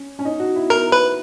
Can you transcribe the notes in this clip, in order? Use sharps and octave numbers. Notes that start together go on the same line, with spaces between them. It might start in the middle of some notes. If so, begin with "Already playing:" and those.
Already playing: C#4
C#4
D#4
F#4
E4
E4 A#4
B4